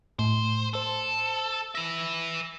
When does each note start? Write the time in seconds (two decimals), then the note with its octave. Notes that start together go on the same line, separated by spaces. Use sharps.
0.19 A2 C5
0.74 A4 C5 A5
1.75 B4 E5 A#6